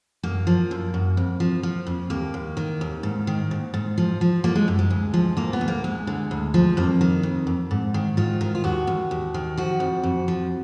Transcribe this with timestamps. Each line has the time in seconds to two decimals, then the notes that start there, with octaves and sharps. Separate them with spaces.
0.23 F#2 A#3
0.47 F3
0.71 F#2
0.94 F#2
1.17 F2
1.40 F3
1.63 F3
1.87 F2
2.10 D#2 A#3
2.34 D#2
2.57 D#3
2.81 D#2
3.03 G#2
3.27 D#3
3.51 G#2
3.74 G#2
3.98 F3
4.21 F3
4.44 F3 A#3
4.55 G#3
4.68 F#2
4.79 G#3
4.90 D2
5.14 F3
5.37 D2 A#3
5.53 B3
5.61 D2
5.68 A#3
5.84 D2 G#3
6.07 D3
6.31 D2
6.54 F3
6.77 F2 A#3
7.01 D#3
7.23 F2
7.47 F2
7.71 G#2
7.94 D#3
8.17 G#2 F4
8.41 D#3
8.55 F4
8.64 D#2 F#4
8.87 D#2
9.11 D#2
9.34 D#3
9.57 F3 F#4
9.80 F2
10.03 F2
10.28 F3